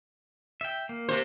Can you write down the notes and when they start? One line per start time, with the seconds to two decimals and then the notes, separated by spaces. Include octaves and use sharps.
0.61 E5 G5
0.89 A#3
1.09 C3 C5